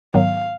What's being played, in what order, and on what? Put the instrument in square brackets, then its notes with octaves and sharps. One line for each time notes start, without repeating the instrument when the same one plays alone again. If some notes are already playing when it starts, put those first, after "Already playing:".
[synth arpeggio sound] G#2 D#3 F#3 B3 [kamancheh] F5